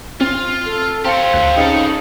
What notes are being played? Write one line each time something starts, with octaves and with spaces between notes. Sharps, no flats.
C4 F4
A4
C4 G4 C#5 F5 A5
D2 F#6
C#3 F3 D#4 A4 C#5